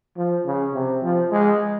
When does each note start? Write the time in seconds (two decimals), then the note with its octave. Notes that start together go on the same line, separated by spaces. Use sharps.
0.17 F3
0.46 C#3
0.74 C3
1.02 F3
1.31 G#3